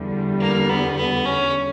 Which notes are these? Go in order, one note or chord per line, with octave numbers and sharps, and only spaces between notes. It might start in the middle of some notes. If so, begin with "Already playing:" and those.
Already playing: E2 D3 G3
A#3
B3
B3
C#4